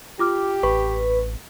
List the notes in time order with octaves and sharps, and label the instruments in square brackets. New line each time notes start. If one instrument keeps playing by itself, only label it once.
[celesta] F4 D6 F6 [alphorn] G4
[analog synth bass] A1 [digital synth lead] B4 [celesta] C#6